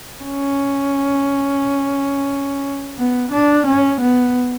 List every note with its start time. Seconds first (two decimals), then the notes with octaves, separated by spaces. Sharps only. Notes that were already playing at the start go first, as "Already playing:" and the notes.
0.23 C#4
2.98 B3
3.32 D4
3.67 C#4
4.01 B3